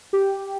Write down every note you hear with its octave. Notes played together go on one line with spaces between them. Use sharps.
G4